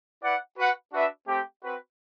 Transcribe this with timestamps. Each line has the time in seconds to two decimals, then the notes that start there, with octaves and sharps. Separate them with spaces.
0.22 E4 B4 D5 F#5
0.57 F#4 B4 F#5
0.92 D4 F#4 B4 E5
1.27 A3 C4 G4
1.62 C4 F#4 B4